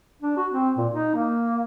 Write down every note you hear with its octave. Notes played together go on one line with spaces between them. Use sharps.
D4
F#4
C4
A#2
D#4
A#3